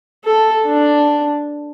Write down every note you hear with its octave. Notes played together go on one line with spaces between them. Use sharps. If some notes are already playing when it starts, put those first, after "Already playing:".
A4
D4